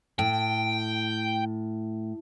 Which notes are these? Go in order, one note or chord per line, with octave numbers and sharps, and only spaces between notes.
A2 G5